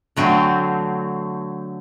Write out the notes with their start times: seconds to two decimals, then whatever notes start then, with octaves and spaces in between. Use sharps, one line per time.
0.16 D3 F#3 A3 C4